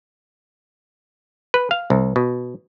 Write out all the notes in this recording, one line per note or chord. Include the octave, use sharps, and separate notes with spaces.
B4
F5
C2
B2